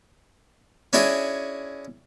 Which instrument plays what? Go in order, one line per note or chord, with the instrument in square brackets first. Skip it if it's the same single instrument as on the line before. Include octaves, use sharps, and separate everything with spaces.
[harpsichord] C#4 D4 E4 F#4 G#4